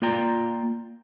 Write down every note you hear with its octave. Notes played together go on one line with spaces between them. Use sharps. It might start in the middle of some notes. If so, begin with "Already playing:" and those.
A#3 F4 D5 G5 A#5